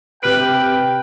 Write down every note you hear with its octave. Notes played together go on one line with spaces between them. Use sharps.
C3 B4 G5 F6 D7